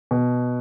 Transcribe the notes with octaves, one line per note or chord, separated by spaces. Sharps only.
B2